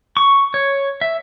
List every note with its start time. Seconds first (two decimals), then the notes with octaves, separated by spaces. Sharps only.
0.17 C#6
0.54 C#5
1.01 E5